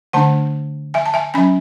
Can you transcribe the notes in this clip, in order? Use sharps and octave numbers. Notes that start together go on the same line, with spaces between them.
D3 A3 D4 F#5 A5
E5 G#5
A5
E5 G#5
F#3 C#4 G#5 B5